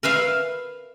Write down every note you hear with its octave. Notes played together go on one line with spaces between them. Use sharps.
A#4 B4 E5 F5